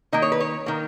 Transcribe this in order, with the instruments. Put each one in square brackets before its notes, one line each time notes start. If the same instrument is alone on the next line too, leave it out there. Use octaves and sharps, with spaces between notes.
[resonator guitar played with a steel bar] D#3 A#3 D#5
C#5
B4
C#5
D#3 A#3